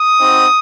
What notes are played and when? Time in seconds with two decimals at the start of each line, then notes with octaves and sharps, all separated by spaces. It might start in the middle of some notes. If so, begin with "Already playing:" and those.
Already playing: D#6
0.20 C4 D#4 F#4